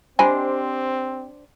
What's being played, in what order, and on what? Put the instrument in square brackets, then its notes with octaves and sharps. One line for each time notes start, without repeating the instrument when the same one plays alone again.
[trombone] C4 [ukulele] D4 G4 C5 [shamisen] D#5 G#5 B5